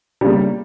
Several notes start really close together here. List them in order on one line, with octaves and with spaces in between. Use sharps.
G3 C#3 A#3